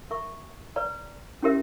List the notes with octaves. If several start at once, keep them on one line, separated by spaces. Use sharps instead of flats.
A#4 E5 A#5 C#6
B4 D5 A#5
C#4 E4 G4 A#4 E5